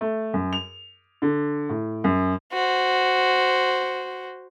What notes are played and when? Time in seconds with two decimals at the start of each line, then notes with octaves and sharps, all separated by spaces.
0.01 A3
0.34 F#2
0.53 F7
1.22 D3
1.69 A2
2.04 F#2
2.52 F#4 C5